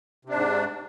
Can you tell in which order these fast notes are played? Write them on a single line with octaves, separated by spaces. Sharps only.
C3 D4 G#2